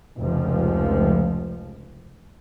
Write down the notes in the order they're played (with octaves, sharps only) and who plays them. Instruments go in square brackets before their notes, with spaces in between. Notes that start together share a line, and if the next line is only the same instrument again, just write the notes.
[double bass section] F1 C#2 F3